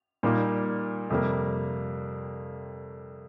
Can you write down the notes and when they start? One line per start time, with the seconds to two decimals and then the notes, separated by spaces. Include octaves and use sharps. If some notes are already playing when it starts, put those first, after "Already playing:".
0.23 A#2 G3 A#3 D#4
1.10 F2 C3 G3 A#3